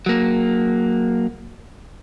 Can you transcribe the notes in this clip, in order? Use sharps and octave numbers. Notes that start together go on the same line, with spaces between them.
F#3 A#3